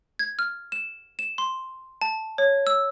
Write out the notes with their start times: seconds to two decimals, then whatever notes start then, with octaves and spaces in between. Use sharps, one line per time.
0.19 G#6
0.39 F6
0.72 E7
1.19 E7
1.38 C6
2.02 A5
2.38 C#5
2.67 E6